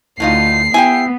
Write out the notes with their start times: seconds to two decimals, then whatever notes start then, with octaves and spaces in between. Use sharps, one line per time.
0.20 D2 A2 D#4 F4 C7
0.74 B3 E4 G4 G5 G#5